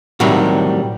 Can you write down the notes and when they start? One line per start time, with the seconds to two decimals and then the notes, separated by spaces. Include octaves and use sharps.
0.20 A2 C3 D#3 F#3 G3